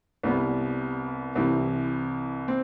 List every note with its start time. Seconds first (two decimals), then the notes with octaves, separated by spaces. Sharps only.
0.23 C2 C3 G3 B3
1.35 C2 C3 E3
2.48 C4